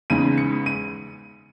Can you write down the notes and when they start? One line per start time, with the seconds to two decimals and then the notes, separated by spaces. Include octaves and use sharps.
0.10 E2 C#3 G#3 D#4 D#7
0.38 C#7
0.66 D#7